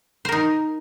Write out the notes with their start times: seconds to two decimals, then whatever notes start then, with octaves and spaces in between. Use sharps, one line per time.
0.25 C5
0.29 A#4
0.32 D#4